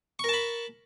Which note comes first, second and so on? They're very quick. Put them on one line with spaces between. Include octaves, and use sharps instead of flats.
C#6 A#4 A5 B5